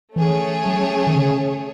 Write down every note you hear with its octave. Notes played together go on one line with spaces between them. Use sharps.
E3 A3 C#4 G#4 C#5
F#3
D#3
C#3